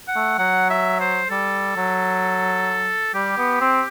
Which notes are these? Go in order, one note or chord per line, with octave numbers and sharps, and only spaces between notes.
F#5
A3
F#3 F#5
E5
C5
G3 A4
F#3
G3 G4
B3
C4